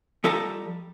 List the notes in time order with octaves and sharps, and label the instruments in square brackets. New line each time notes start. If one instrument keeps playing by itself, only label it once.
[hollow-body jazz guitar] F3 G3 A4 D#5 A5 A#5